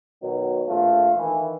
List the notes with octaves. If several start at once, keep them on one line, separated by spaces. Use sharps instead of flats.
B2 D#3 F#3
A#1 A3 F4
D#3 E3